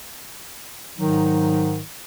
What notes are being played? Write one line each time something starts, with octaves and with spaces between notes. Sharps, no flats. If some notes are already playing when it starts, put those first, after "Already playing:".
G#2 D#3 F#3 D#4